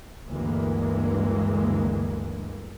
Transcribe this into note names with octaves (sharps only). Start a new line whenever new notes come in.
D2 G2 D3 E3 G#3 A#3